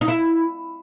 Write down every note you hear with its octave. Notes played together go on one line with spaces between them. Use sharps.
D#4
E4